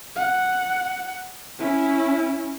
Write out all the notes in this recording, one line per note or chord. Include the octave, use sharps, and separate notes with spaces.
F#5
C#4 E4